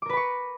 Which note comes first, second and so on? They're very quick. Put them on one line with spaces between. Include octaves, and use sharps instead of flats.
D6 A#4 B4 B5 C#6